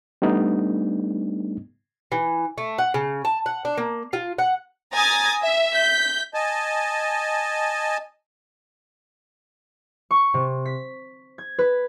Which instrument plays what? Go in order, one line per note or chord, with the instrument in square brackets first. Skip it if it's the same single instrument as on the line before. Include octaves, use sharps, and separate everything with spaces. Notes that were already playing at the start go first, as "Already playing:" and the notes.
[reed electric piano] G3 A3 B3 D4 D#4
[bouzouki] E3
A3
F#5
C#3
A5
F#5
D4
A#3
F4
F#5
[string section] G#5 A#5 D#6 G#6 A6
E5
G6 B6
[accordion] D#5 G#5 A5
[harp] C#6
C3
B6
G#6
B4